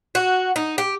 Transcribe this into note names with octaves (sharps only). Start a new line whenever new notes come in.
F#4
D#4
G4